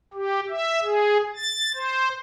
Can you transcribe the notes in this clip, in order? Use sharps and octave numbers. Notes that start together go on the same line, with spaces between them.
G4
E5
G#4
A6
C5